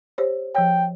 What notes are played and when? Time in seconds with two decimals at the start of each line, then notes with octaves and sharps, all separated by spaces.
0.18 G4 C5 C#5
0.55 F3 C#5 G5